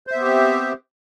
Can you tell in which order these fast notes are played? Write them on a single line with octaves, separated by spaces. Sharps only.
C5 E5 B3 G4 C4